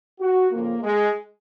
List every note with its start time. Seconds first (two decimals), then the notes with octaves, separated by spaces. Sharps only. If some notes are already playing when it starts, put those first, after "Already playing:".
0.20 F#4
0.51 F2 C#3 F3 A#3
0.82 G#3